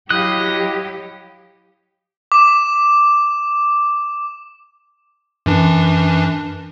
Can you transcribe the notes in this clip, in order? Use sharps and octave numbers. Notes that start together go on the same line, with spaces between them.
F#3 E4 G4 D#5 F5 F#6
D6 E7
F#2 E3 D4